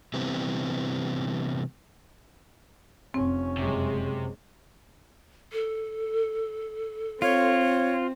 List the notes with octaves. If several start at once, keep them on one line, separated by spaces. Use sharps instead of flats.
C3 E3 G3 B3 C4
F1 C4 C#4
F#1 C3 G#3
A4
C4 F4 C#5